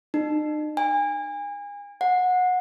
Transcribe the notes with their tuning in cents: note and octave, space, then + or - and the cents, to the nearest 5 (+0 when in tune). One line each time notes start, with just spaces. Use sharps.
D#4 -40
G#5 -35
F#5 -20